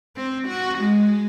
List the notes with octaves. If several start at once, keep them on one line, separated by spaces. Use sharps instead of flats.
C4
F#4
G#3